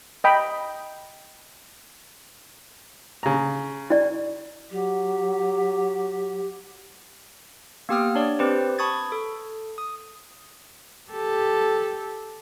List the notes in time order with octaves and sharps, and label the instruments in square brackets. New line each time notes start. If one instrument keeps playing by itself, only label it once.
[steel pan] D#5 G5 B5
[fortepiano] C#3 A#5
[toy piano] E4 D5
[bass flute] F#3 [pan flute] G4
[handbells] A#3 B3 G4 G5 D#6 F6
D4 C#5 D5
C4 G4 B4 C5
A5 B5 C#6 D#6 G#6 A6
A4
D#6
[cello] G4 A4